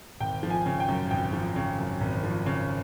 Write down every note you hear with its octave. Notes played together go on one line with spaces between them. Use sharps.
G#1 G5
F3
G#5
C#3
G5
F#2
G#1 G5
F3
C#3
F#2
G#1
F3
C#3